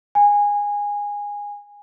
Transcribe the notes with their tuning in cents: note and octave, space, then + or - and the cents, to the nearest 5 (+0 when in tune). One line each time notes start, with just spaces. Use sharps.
G#5 -15